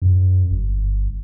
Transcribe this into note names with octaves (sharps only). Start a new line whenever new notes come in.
F#2
G1